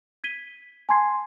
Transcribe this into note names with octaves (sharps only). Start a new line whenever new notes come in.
G#6 B6 D#7 G7
G#5 A5 C6 G#6 C7